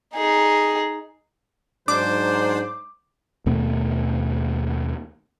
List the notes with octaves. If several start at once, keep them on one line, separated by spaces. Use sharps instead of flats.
D#4 G#4
G#2 F#3 D4 C5 D6
D#2 B2 A3 B3